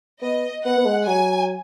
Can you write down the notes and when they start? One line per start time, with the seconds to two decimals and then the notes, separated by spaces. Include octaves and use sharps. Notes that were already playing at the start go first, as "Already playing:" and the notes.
0.22 B3 D#5
0.64 B3 F#5
0.78 B3
0.86 G#3
1.07 F#3 G#5